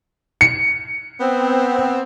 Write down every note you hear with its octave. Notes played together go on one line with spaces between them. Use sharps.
C#7
B3 C4